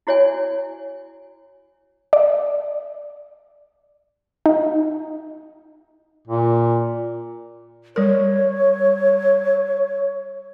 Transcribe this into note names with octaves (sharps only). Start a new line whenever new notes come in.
E4 F#4 C#5 D5 G#5
D5
D#4
A#2
G3 A#4 C#5